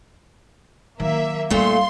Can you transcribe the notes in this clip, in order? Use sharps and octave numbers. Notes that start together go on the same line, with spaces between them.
D#3 F#3 A#3 E5
A#2 G3 A3 D#4 F5 C6